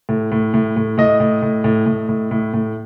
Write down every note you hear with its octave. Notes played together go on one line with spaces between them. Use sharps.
A2
A2
A2
A2
A2 D#5
A2
A2
A2
A2
A2
A2
A2